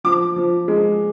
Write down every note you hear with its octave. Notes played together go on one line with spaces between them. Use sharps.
F3 D6
F3
G#3